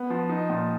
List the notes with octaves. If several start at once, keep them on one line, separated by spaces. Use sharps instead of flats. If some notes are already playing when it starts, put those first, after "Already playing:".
Already playing: B3
F3
D#4
A#2